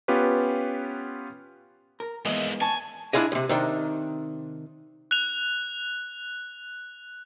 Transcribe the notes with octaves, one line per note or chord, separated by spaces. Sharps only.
B3 C#4 F4 G4 B4
A#4
G#2 E3 G#3 A#3 B3 D#5 E5
C#5 G#5 A5
D4 E4 F4 G#4 D#5
D2 C3
C3 D#3 D4
F#6 F7